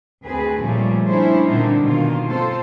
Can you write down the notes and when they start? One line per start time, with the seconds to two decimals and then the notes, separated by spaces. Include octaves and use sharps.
0.24 D2 C4 G#4 B4
0.60 A#2 C#3 F3 G3 A3
1.06 C#4 D4 E4 C5
1.48 A#2 D3 G3 C4 D4 D#4
1.80 B2 D#3 A#3 F4
2.27 C4 F4 A4 C5